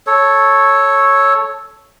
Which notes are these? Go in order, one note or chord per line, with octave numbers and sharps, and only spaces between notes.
A4 C#5